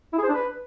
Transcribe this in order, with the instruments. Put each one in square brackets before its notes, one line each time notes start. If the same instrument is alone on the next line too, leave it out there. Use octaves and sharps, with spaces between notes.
[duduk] E4
G#4
C5
D4
B4